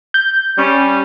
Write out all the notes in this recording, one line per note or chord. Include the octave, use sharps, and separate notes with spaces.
G6
G3 C#4